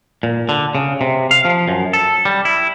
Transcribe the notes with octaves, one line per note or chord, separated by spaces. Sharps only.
A#2
D3
C#3
C3
F5
F3
F#2
A4
G3
E4